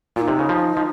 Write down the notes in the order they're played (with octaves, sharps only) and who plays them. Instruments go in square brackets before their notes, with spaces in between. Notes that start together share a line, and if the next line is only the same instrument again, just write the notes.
[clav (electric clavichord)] A#2 [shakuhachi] F4
[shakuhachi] D#4
[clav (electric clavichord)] C3
C#3
F3
F3